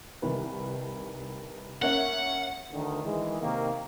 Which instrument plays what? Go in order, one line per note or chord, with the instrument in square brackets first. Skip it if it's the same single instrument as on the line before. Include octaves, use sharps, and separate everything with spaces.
[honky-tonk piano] C2 D#3 B4
[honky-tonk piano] A#3 C#4 E5 [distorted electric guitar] F#5
[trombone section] D2 D#3
D#3 E3 G#3
C3 D#3 A#3